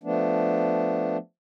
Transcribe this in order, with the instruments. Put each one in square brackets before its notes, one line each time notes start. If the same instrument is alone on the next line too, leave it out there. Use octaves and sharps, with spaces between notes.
[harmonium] F3 A3 B3 D4